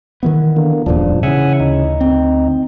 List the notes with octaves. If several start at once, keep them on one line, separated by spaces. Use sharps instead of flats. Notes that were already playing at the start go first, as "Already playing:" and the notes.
D#3 E3 B3
D3 A#3
D#1 E2 G2 A#2 F3 D4
C#3 E3 E5 F#5 G#5
D2 D#4
C4